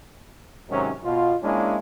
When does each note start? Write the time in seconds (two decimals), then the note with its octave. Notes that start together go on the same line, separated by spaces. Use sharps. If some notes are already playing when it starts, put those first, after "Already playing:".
0.70 G#2 C3 D#3 F#3 C#4
1.04 B2 F4
1.43 G#3 A#3 C#4 D4 E4